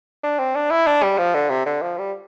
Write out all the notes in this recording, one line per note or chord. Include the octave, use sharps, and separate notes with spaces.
D4
C4
D4
E4
D4
G3
F3
D3
C3
D3
F3
G3